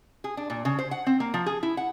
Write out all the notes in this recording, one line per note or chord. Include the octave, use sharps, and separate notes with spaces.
G#4
D4
A#2
C#3
C5
F#5
C4
A#3
F3
G#4
E4
F#5